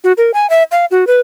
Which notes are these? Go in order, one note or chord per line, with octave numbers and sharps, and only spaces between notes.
F#4
A#4
G#5
E5
F5
F#4
B4